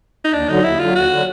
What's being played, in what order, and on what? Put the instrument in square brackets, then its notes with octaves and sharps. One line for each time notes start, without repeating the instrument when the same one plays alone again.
[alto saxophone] D#4
[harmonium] D#2 [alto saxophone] D4
[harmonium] D3 F#3 [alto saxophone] D#4
[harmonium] D#2 [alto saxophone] E4
[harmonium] D3 F#3 [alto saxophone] F4
[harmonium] D#2 [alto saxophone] F#4
[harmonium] D3 F#3